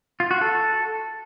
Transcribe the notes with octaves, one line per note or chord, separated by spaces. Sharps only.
F4
F#4
A4